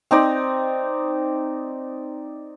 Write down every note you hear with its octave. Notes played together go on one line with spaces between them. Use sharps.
C4 D#4 D5